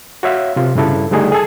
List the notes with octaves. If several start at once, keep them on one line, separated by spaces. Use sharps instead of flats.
F#4 C#5 E5 F5
C3 F4
G2 C#3 E4 A4
D3 G3 A3 D#4 G#4
G#4 A4 A5